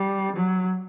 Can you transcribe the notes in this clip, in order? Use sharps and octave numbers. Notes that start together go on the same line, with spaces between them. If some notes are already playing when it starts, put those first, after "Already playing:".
Already playing: G3
F#3